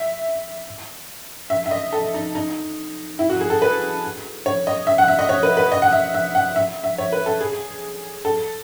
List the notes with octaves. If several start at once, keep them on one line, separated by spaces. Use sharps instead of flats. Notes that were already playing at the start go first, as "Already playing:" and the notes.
Already playing: E5
E5
E5
D#5
A4
D#4
D#4
E4
F#4
G#4
A4
B4
C#5
D#5
E5
F#5
E5
D#5
C#5
B4
B4
D#5
F#5
E5
E5
F#5
E5
E5
C#5
B4
A4
G#4
A4